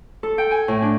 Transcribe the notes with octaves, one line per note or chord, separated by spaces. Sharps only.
A4
G5
G#5
A2
D4